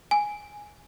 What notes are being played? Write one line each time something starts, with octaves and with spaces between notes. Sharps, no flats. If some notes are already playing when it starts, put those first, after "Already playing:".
G#5